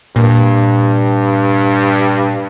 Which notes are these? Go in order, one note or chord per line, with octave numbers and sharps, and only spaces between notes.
G2 A#2